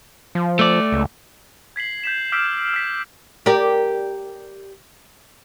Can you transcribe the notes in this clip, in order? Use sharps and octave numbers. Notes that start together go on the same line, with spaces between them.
F3
A3 D5
C#2
G#6 B6 C7 F#7
G6 B6 E7
D6 E6 F6 G6 B6 D7
F6 B6
G4 A#4 D5